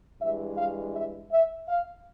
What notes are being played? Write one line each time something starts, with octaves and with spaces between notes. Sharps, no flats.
G2 E3 G#3 E5
F5
E5
E5
F5